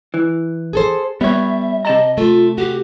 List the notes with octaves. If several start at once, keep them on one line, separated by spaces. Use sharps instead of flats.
E3
G#4 A4 C5
G3 B3 C#5 E5
C3 D#5 A5 A#5
A3 F4
F#4 G4